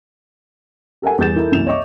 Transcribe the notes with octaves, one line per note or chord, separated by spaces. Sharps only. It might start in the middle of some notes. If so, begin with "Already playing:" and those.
G4 A4 A#4 F#5 G#5
E2 G3 G#4 G6 A6 E7
E3 D#4 E4 A4 A#4
C2 F#2 E3 A#3 E7 F7
C#5 D#5 E5 C#6 D6